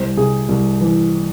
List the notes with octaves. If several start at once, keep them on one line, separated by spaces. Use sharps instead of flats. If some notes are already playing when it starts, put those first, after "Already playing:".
Already playing: C2 C5
C3 G#4
C2
E3